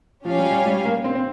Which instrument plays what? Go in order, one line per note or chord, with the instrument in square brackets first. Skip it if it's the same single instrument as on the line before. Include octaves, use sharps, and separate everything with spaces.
[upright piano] F3 [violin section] C#4 G4 C#5 F5 G#5
[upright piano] G3
G3
G3
A#3
C4
C4